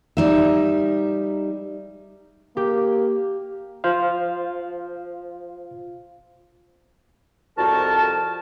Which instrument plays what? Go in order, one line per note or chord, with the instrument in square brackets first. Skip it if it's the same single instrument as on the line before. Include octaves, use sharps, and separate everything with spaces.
[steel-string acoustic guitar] G3 D#4 E5
[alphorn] A#3 [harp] G4
[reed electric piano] F4 C5 F5
[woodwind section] C2 F2 F#4 A#4 A5